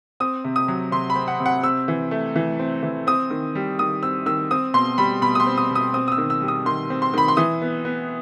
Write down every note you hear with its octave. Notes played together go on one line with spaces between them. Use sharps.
C4 D#6
C3
D#6
F#3
C3 C6
B5
C4
F#5
C3
F#5
C4 E6
E3
A3
E3
C4
E3
C4 D#6
D#3
G3
D#3 D#6
C4 E6
D#3 E6
C4 D#6
B2 C6
G3 B5
B2 B5
D#6
C6
C4
D#6
B2
D#6
C4 D#6
D#6
E6
D#3
E6
G3
D#6
D#3 C6
C4
C6
D#3 B5
C6
E3 D#6
B3
B3